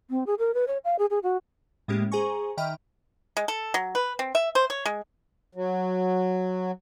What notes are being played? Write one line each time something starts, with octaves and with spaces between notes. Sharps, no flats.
C4
G#4
A#4
B4
C#5
F5
G#4
G#4
F#4
A2 G#3 A#3 C#4 G4
G#4 C5 G#5 A#5 C#6
D#3 D#5 E5 G5 B5 F6
G#3
A4
F#3
B4
C4
E5
C5
C#5
G#3
F#3